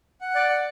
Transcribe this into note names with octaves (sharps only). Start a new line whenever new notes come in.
F#5
D5
F#5